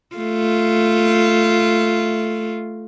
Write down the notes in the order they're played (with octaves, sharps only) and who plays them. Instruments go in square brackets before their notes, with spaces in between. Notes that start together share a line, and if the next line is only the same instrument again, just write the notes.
[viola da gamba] A3 F4